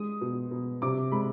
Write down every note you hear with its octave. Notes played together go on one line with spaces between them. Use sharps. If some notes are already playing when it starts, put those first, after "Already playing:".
Already playing: G#3 D#6
B2
B2
C3 D6
G#3 B5